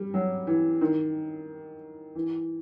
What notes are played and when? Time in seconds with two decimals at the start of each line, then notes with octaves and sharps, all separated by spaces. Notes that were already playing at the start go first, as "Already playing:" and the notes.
Already playing: G3
0.14 F#3
0.47 E3
0.81 D#3
2.15 E3